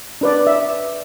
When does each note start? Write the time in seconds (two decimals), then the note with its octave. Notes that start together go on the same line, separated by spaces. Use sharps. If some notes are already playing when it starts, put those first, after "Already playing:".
0.21 D4 B4 D5
0.47 E5